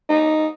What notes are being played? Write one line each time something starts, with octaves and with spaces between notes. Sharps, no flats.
D#4